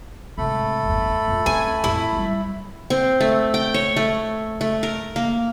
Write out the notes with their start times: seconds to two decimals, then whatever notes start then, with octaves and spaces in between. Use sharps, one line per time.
0.38 G#2 C3 A3 A4 B5
0.83 G1 E2
1.28 A#1 F2
1.46 C4 C#4 G#5
1.84 F2 A2 E4
2.13 F#3 G3
2.90 C4
3.20 A3
3.54 G5
3.74 C#5
3.97 A3
4.61 A3
4.83 A#4
5.16 A#3